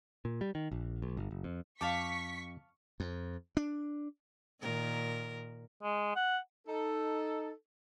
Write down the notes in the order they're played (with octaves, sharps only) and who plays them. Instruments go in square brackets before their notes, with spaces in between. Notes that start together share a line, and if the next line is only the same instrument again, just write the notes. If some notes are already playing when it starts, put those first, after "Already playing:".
[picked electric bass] A#2
G3
D#3
A#1
B1
G1
F#1
F2
[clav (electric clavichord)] F2 G5 [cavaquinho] F5 A5 D6 [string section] C#6 B6
[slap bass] F2
D4
[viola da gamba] A#2 D#3 A#4
[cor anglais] G#3
F#5
[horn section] D#4 A4